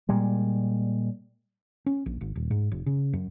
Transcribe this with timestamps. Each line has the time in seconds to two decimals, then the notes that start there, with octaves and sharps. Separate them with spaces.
0.09 A#2 G3 G#3
1.86 C#4
2.06 A#1
2.21 G#1
2.35 D#1
2.51 G#2
2.72 F1
2.86 C#3
3.13 F#2